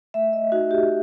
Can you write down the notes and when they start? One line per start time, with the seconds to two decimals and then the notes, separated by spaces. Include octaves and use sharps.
0.14 A3 E5
0.33 D#5
0.52 D#4 F#4
0.71 G4